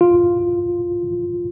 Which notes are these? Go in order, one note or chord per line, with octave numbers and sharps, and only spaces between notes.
F4